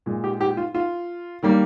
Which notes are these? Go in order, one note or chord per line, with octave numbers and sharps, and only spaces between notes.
A#2 G#3
G4
G4
F4
F4
D#3 G3 A#3